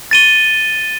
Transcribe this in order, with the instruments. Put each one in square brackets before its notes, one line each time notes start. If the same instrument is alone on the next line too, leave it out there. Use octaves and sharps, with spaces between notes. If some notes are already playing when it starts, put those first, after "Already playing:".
[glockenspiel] A6 D#7 G7